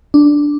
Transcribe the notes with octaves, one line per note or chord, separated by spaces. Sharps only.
D4